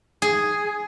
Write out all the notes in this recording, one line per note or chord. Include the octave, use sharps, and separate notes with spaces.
G#4